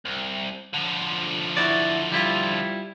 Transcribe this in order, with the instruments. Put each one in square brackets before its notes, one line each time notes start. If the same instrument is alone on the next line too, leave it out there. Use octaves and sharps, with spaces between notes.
[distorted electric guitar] C2
D3 F3
[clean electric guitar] E4 F#4 D5
G3 E4 F4